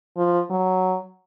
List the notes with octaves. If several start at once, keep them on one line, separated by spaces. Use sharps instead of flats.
F3
F#3